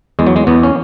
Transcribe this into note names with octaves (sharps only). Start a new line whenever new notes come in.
E2 G#3
F#3
G#3
E2 B3
C#4